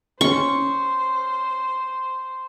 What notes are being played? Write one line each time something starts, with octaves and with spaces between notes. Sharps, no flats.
C#4 C5 C#6